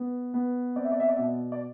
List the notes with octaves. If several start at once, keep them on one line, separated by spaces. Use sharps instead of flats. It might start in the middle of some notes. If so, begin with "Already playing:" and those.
Already playing: B3
B3
C4 D5
E5
D5
E5
D5
B2 E5
D5
D5